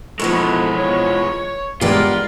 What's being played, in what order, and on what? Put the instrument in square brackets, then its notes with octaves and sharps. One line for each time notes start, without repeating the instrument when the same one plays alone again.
[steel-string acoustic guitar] F2 F3 B3 [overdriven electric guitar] E3 G#3 [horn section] D#4 A4 [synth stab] C#6
[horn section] C#5
[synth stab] G2 E3 G#3 [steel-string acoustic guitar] B3 G4 [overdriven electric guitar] F4 [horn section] A#4 D5